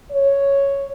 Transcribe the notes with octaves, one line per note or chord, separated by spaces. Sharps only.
C#5